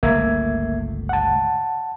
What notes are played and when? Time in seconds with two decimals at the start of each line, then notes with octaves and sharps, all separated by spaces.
0.03 G1 C#2 A3 A#3 E5 G#6
1.09 F#5 A5